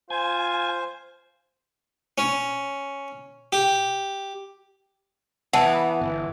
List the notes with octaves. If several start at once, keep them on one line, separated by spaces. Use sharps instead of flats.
F4 C5 G#5
C#4
G4
E3 B3 F#5 A5
G1